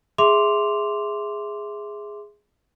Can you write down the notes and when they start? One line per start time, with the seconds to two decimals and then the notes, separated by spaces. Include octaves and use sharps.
0.18 G#4 E5 C6 D6 F7